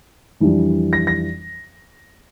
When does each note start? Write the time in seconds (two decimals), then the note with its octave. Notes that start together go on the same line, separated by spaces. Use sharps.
0.40 F2 E3 G3 D4
0.93 A#6
1.07 A#6